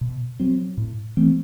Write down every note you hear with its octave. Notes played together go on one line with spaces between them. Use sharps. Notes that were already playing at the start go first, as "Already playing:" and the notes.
B2
F#3 C4
A2
E3 A3 C4